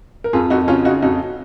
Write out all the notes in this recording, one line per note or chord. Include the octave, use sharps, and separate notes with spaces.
A#4
F2 F4 G#4
F2 D#4 F#4
C#3 C#4 F4
C#3 D#4 F#4
F2 D#4 F#4